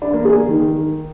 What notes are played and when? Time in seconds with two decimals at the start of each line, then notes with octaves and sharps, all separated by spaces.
0.02 D4
0.13 A#3
0.25 G#4
0.37 A#3
0.48 D#3